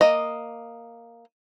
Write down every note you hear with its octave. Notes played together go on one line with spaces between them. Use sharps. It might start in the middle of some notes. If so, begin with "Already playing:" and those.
A#3 D#5